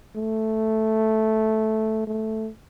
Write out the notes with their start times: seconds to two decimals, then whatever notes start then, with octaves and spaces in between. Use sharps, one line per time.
0.16 A3
2.07 A3